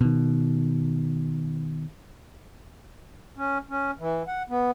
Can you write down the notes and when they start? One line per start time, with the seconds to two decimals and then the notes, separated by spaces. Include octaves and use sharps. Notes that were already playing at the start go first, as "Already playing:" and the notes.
0.01 B2 D#3
3.37 C#4
3.70 C#4
3.99 E3
4.28 F#5
4.49 B3